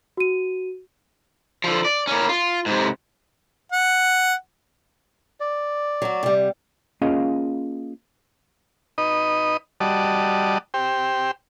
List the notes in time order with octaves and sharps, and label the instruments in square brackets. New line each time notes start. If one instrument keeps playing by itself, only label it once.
[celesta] F#4 D#7
[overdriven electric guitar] D3 F3
D5
A#3 C#4
F4
G#2 C3
[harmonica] F#5
[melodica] D5
[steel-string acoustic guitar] F#3 F#4
C3 G3
[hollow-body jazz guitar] A#3 C#4 F4 G#4 D#5 F5
[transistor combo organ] D#4 B4 D#5
G3 F#4 D5 D#5 A5
G4 C5 G5